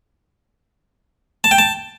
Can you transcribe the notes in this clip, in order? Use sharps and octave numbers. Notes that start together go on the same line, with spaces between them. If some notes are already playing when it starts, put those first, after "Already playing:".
A5
G5
A5